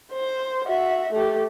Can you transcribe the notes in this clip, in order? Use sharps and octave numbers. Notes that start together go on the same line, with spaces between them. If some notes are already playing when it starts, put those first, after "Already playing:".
C5
F#4 E5
A3 G4